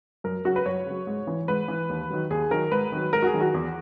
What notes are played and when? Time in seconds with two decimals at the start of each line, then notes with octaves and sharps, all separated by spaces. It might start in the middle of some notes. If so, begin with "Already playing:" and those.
0.24 F#2 A#4
0.45 C#3 F#3 F#4
0.56 B4
0.66 F#2 C#5
0.86 C#3 F#3
1.07 G#2
1.27 E3
1.48 G#2 B4
1.68 E3
1.89 D#2
2.10 D#3 F#3
2.30 D#2 G#4
2.51 D#3 F#3 A#4
2.71 G#2 B4
2.92 D#3 F#3
3.13 G#2 A#4
3.22 F#4
3.26 G#4
3.33 D#3 F#3
3.41 F#4
3.54 E2